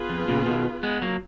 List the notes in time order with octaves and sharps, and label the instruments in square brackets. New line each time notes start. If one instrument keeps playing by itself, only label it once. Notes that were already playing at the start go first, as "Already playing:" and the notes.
Already playing: [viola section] B3 F4 G#4 B4
[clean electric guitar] F2
A#2 C#3
B2 D#3
G#3 B3
F#3 A#3